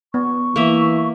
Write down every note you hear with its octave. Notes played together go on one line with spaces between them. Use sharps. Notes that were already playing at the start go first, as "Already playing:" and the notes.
B3 C#6
E3 A#3 E5